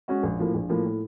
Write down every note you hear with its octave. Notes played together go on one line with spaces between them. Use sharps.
G#3 C#4 F#4
A#1
A2 F3 A#3
A#1
A2 F3 A#3
A2